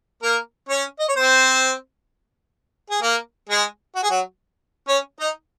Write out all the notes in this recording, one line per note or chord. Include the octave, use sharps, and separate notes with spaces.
A#3 A#4
C#4 C#5
D#5
C#5
C4 C5
G#4
A#3 A#4
G#3 G#4
F#4
G#4
F#3 F#4
C#4 C#5
D#4 D#5